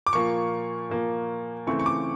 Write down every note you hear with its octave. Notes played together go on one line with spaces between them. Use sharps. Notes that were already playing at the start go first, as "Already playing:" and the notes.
D6
A#2 F3 A#3 C#6
A#2 F3 A#3
C#3 E3 A3 C4 C#6
C#6
D6